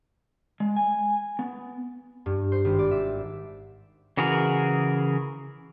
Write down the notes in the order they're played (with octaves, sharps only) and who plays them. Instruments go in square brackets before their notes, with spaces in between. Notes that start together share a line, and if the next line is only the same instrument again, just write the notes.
[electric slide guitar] G#3
G#5
B3
[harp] G2
C5
G#1
D5
E5
[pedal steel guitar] C#3 E3 F#4 G#4 A#4